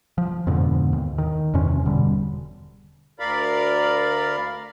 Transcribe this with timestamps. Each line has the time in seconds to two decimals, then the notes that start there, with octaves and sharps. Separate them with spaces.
0.18 F3
0.47 F2 G#2 B2 D3
0.93 D#2
1.18 D#3
1.54 E2 G2 C3 C#4
1.85 E1 B2 D3 G3
3.20 D2 A#4 D5 F5 B5